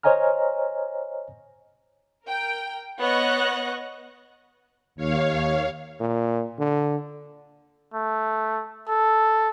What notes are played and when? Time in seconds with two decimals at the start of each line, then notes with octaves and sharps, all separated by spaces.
0.03 C5 C#5 D#5 G#5 A#5 F6
2.26 A#4 G5
2.99 B3 C#5 D#5 C#6 F#6 A#6
4.96 D#2 C#5 F5
6.01 A#2
6.59 D3
7.94 A3
8.89 A4